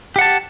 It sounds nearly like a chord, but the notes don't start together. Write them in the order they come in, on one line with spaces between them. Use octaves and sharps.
G4 F#5 A5